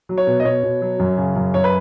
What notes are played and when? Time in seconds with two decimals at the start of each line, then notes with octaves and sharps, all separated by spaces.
0.09 F#3
0.18 C#5
0.27 B2
0.40 D#5
0.45 B2 C#5
0.63 B2
0.81 F#3
0.99 F#2
1.18 C#3
1.36 F#2
1.54 F#2 C#5
1.64 B4